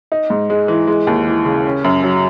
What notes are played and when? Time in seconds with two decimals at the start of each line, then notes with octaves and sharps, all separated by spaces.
0.12 D#4
0.30 G#2
0.50 G#3
0.68 E3
0.87 G#3
1.07 D#2
1.27 E3
1.45 C#3
1.66 C#4
1.84 F#2
2.03 F#3